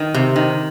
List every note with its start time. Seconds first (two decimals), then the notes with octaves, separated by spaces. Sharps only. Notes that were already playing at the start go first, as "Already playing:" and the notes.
Already playing: D#3
0.14 C3
0.36 D#3